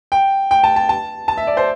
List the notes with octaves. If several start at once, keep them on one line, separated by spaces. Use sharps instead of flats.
G5
G5
A5
A5
A5
A5
E5
D5
C5